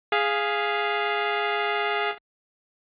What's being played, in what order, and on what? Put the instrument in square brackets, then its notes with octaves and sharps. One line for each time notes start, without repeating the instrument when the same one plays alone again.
[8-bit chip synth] G#4 F5 B6